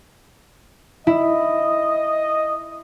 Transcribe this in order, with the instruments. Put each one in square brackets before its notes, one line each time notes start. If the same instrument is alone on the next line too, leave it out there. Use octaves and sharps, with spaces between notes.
[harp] E4 [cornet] D#5